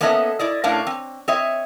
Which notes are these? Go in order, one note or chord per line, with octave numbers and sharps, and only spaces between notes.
A#3 B3 C#4 A4 D#5 E5
E4 D5 D#5
A2 A3 C#4 D4 A#4 F5
C4
C4 C#5 D#5 E5